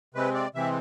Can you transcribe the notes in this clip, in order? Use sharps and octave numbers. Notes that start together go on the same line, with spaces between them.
C3 G#3 C4 B4
D5
C3 E3 G#3 C4 E5